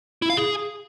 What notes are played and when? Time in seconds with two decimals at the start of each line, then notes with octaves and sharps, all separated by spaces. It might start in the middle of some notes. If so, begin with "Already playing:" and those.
0.22 E4
0.30 F5
0.37 G#4